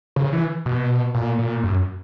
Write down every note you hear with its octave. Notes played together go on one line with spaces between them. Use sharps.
C#3
E3
B2
A#2
A#2
F#2